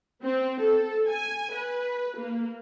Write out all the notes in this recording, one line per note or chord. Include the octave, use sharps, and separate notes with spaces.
C4
A4
G#5
B4
A#3